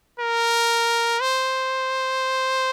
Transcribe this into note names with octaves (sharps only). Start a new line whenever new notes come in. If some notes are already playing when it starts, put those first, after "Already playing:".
A#4
C5